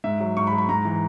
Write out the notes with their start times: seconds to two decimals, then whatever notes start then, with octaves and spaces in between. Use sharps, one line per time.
0.04 G#2 E5
0.20 F#3
0.37 G#2 C#6
0.47 B5
0.53 F#3
0.58 B5
0.69 G#2 A#5
0.85 E3